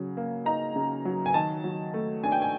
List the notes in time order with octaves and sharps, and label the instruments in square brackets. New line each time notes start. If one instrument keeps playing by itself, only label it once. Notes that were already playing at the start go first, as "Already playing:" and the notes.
Already playing: [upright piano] C#3 F#3
A#3
D#4 A#5
C#3
F#3
G#5
D#3 A5
F#3
A3
D4 G#5
G5
G#5